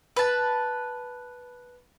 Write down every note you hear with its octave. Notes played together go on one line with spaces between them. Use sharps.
B4 A5